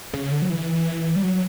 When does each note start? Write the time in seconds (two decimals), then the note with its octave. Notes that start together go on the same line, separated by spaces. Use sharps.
0.14 C#3
0.32 D3
0.42 F#3
0.50 E3
1.16 G3
1.23 F#3